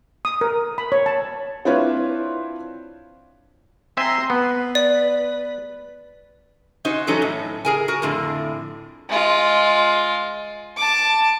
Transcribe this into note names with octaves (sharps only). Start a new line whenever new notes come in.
D#6
A#4
B5
C#5
A5
C4 D4 E4 F4 B4 C#5
C4 E5 G#5 A#5 C6
B3 B4
D5
C#4 D#4 F#4 C5
E3 F#3 C#4 D#4 A4
A2
G#4 A#4 G#5
F#4 A#4
F2 A2 D3
G#3 F4
A5 D6